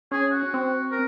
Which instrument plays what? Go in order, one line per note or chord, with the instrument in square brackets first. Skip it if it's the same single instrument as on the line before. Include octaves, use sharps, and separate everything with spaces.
[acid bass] C#4 [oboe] G#4
[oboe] F#4
[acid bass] C4
[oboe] A#4